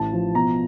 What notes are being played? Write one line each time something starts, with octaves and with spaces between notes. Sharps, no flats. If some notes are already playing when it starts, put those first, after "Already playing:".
Already playing: A1 A5
F3
B2 A#5